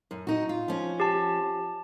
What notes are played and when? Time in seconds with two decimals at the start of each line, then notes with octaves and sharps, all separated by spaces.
0.11 F#2
0.27 D#4 F#4
0.49 F4
0.68 F3 C#4
1.00 G4 A5